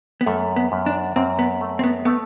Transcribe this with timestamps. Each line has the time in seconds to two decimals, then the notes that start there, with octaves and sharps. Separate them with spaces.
0.21 B3
0.26 F#2 A3
0.56 B3
0.72 F#2
0.86 D4
1.16 F#2 C4
1.39 B3
1.61 A3
1.79 C4
1.84 B3
2.05 A3 B3